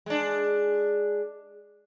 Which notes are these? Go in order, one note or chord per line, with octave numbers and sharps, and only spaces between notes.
G#3 D4